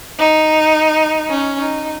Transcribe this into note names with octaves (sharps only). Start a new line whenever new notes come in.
D#4
C#4
D#4